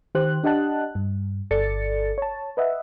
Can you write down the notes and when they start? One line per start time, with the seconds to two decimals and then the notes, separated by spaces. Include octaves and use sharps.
0.15 D#3 G4 C5 F#6
0.43 D4 G4 D#5 F#5 A5 F#6
0.95 G2
1.51 G1 A4 D5 A6 C#7
2.18 C#5 A5
2.57 B4 D#5 E5 F#5